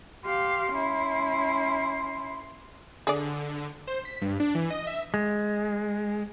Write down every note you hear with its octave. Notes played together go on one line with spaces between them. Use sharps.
G4 F5 C6
C#4 E4
D3 G#4 D5
C5
B6
G2
D4
E3
D#5
E5
G#3